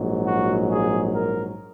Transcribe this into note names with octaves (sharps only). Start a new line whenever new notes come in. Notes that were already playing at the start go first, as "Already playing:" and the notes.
Already playing: A#1 G#2 F#3
F#4
G#4
A#4